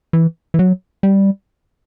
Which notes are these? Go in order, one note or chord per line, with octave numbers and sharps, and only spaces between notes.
E3
E3
F#3
G3